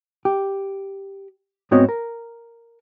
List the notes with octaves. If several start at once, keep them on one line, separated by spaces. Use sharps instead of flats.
G4
G#2 B3 C4 F#4 C#5 D#5
A#4